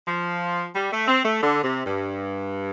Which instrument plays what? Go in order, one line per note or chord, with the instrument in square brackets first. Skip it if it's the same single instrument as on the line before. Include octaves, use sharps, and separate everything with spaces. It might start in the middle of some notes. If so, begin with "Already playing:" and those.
[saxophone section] F3
G3
A3
C4
A3
D3
C3
G2